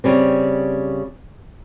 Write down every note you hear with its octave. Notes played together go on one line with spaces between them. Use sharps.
C#3 G3 C4